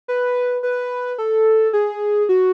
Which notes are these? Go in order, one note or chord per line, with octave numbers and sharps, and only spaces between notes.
B4
B4
A4
G#4
F#4